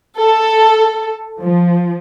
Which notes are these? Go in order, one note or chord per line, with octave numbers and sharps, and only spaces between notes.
A4
F3